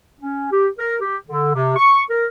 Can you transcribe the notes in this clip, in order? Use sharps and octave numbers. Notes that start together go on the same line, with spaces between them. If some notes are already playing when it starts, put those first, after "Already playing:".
C#4
G4
A#4
G4
D3
C3
C#6
A#4